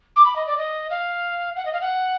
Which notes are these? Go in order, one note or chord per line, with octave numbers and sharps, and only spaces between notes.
D6
B5
D#5
D5
D#5
F5
F#5
D#5
F5
F#5